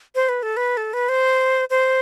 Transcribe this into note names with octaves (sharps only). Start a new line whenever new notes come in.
C5
B4
A4
B4
A4
B4
C5
C5